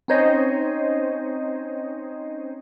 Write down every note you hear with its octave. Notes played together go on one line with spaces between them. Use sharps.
C4 C#4 D#4 C5 C#5 D#5